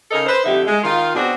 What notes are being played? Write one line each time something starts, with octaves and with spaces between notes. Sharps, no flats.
C#3 D#4 A4 A#4 D#5
B4 C5
F2 D3 D#4 G4 E5
G#3
D#3 F4
B2 C4 D4 F#4 G#4